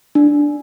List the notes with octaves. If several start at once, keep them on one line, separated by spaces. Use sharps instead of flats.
D4